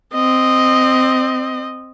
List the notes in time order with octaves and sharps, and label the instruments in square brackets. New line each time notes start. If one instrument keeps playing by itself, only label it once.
[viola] C4 D#5